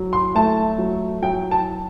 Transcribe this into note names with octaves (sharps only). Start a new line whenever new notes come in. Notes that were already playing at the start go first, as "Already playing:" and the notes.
Already playing: F#3
C6
A3 A5
F#3
F#3 G5
A5